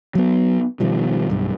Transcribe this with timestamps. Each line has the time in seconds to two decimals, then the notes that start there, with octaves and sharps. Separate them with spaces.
0.15 F#3 B3
0.80 B2 D#3 F3 G3
1.30 B1 G2